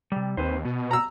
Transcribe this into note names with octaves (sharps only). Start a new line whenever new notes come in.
C3 G3
D#2 C4 B4 C5
B2 B3
A#5 E6